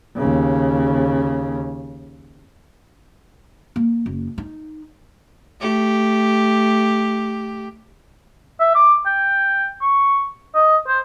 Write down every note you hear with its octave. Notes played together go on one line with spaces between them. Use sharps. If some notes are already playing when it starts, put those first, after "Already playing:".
D#2 C#3
A#3
F#1
D#4
A3 G4
E5
D6
G5
C#6
D#5
C5